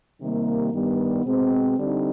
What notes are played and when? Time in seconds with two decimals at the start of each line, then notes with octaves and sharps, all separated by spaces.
0.21 C3 D#3 G3 A#3
0.72 G2 D#3 G3 B3
1.25 B2 G#3 C4
1.77 D3 G3 C4 D#4